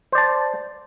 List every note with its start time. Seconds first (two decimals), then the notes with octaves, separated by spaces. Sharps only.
0.12 C5
0.15 D5
0.18 A5